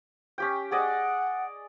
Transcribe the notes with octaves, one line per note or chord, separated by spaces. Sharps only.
C#4 G4 G5
G#4 D5 D#5 F#5